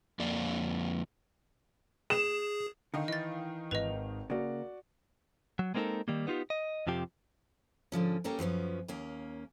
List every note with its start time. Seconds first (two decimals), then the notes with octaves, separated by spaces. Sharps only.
0.19 F2 A#3 D5 F5
2.10 G#4 E7
2.94 D3 D#3 D#4 F5
3.08 E3 D#5 A6
3.71 G#1 B4 D#5 F7
4.30 C#3 A#3 F#4 D5
5.59 F#3
5.74 G#3 A#3 C4 D#4 A4 A#4
6.08 D#3 G3 A#3
6.27 B3 D#4 F4 G4
6.50 D#5
6.87 F2 C3 F3 G4
7.92 G#2 D3 F3 C#4
8.24 A#3 C#4 G4 A4 A#4
8.39 F#2 F3 B3 C#4
8.88 D#2 A#3 C#4